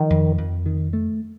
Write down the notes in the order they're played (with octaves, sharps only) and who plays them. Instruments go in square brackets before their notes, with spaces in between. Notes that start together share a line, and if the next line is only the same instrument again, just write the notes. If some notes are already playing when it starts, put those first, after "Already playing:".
Already playing: [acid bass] D#3 [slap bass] F3
[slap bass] F2
F2
D#3
A3